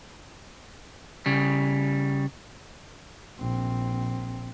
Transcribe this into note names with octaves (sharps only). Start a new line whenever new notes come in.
C#3 G3
A#1 C4